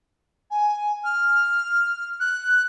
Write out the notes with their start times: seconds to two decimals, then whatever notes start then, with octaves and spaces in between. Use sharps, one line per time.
0.51 G#5
1.04 F6
2.20 F#6